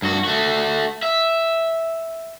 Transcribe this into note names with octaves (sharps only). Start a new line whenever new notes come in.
G2 F#4
A3 F#4
E5